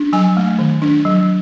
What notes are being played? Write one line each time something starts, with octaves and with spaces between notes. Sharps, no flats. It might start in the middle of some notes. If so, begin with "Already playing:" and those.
Already playing: D4
F#3 G#5
A3
D#3
D4
F#3